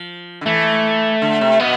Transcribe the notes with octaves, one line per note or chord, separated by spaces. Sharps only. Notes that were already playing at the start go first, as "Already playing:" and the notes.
Already playing: F3
D3
E3 A3
D3
C3
B2 B3